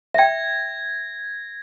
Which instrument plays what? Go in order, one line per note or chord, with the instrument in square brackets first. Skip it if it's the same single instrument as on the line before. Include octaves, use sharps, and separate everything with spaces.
[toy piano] E5 G5 [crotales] G#6 A#6